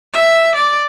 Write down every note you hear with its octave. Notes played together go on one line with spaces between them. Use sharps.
E5
D5